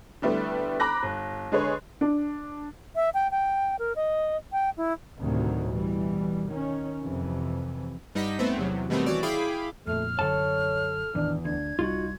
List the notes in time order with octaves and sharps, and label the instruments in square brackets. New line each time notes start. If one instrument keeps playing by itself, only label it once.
[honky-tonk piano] D3 G3 A3 B3 E4
A#5 B5 D6 F#6 A#6
G1
D3 G#3 G#4 B4 C#5
[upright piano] D4
[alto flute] E5
G5
G5
A#4
D#5
G5
E4
[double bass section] D2 A2 C3 D#3 F#3
B2 E3 G3
D#3 C#4
F2 C3 E3
[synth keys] G2 G3 D#4 D#5 F#5 B6
A3 B3 C4
E2 C3 F#3
B2 D#3 G3 A3 B3 C4
E3 F#4 C#5 D5
E4 G#4 F5 G5 B5 D6
[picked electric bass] F2 A#2 [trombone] A3 [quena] F6
[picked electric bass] F#2 D3 [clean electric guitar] A4 A5 [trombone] C#5
[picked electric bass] A1 D#3 [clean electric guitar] E2 [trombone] D4
[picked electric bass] D2 [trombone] D4 [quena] G#6
[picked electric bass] C2 G3 [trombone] D#4 [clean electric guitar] F4 F#4